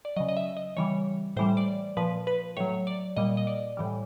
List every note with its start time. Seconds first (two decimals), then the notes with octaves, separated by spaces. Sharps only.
0.05 D5
0.16 C#3 F#3 D#5
0.29 D#5
0.37 E5
0.57 D#5
0.77 C#3 E3 G3 C#5
1.37 A2 E3 G3 C5
1.57 D5
1.97 A#2 F3 B4
2.27 B4
2.57 A2 F#3 C#5
2.87 D5
3.17 A#2 G3 D#5
3.37 D#5
3.47 D5
3.77 A2 E3 G3